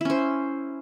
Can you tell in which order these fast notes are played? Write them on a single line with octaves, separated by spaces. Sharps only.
E4 C#4 C5